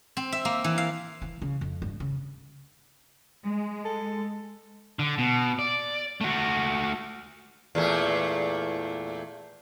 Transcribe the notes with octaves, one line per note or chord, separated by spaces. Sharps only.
C4
E5
A#3
E3
F5
E3
C#3
F2
G2
C#3
G#3
A4
D3
B2
D5
A3 F#4
E2 A#2 A3